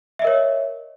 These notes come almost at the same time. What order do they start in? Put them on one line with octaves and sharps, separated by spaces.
E5 D#5 A#4 C#5